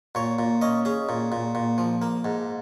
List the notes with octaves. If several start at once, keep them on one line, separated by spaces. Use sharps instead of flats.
A#2 C#5
A#2
C#4 D#5
C#4 G#4
A#2
A#2
A#2
F3
A#3
G#2